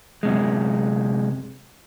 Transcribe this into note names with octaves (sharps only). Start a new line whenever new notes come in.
F#2 C3 G#3